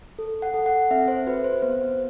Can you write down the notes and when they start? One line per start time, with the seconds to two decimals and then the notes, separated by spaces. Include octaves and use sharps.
0.19 A4
0.42 F#5
0.54 A4
0.66 F#5
0.91 C4 E5
1.08 C5
1.27 F#4 B4
1.44 C5
1.62 B3 C5